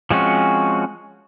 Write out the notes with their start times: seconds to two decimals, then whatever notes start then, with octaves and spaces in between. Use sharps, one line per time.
0.11 F3 G#3 C4 C#4 F#4